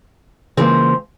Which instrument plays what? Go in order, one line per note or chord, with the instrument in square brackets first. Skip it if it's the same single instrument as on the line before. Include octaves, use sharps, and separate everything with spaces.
[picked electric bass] C#3 E3 A#3 [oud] F3 G#3 C4